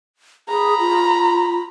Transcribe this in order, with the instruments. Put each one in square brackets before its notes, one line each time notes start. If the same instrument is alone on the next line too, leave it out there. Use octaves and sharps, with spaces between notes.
[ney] G#4 [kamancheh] A#5 B5
[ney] F4